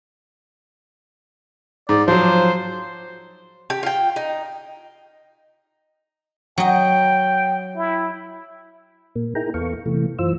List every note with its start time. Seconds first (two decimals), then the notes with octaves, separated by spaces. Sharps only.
1.89 G#2 D5
2.08 F3 F#3 C5
3.70 G4
3.83 F4 G5
4.16 D#4
6.58 F#3 D#5 G5
7.77 E4
9.16 A#2 A#3
9.35 D#4 E4 G#4 A#4 G5 A#5
9.54 E2 B3 A4 F5 C#6
9.86 C3 E3 A3
10.19 F#2 E3 F4 C5 E6